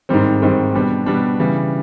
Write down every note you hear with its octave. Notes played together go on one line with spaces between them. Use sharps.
G#2 D#3 G3 C4
G#2 D#3 G3 C4
B2 G3 B3 D4
B2 G3 B3 D4
C#3 E3 G3